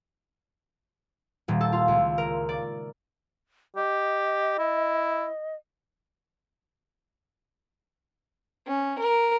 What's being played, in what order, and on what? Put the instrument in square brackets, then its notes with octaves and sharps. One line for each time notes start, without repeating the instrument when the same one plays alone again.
[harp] D#1
A4
F4
C#2
A#4
D5
[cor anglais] G4 [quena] D#5
[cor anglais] E4
[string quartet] C#4
A#4